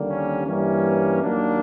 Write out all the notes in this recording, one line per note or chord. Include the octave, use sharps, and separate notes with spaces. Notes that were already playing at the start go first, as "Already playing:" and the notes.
Already playing: D#2 D3 G3 A#3
C#4
G2 E3 G3 A#3 C#4
D#2 D#3 F#3 A#3 D4